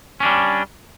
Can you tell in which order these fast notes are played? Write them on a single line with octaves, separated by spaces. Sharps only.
C#4 D4 G3